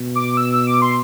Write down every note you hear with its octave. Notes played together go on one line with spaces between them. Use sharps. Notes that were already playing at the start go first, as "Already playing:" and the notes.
Already playing: B2
D6
E6
E6
D6
C6